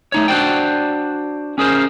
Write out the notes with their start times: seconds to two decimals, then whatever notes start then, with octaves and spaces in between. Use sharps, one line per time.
0.12 A3 D#4 C#5
0.28 D4 F#4 C5 D5 G5
1.58 C#4 G#4 A#4 C5